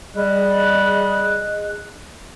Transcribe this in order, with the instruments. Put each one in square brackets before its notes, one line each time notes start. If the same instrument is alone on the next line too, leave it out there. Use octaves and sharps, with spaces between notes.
[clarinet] G3 [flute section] G#4 D#5 F#6